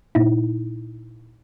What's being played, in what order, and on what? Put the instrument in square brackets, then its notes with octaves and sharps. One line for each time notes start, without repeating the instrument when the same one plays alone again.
[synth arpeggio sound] A#2 D#4 E4